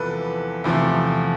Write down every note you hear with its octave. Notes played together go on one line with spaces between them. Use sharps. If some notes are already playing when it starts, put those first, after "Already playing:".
Already playing: E2 C3 F3 A4 B4
E2 C3 F3 A3